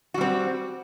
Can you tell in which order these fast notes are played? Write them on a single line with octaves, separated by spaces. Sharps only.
F#4 G3 C4